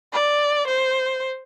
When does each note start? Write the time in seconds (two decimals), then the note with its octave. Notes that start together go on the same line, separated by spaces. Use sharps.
0.13 D5
0.67 C5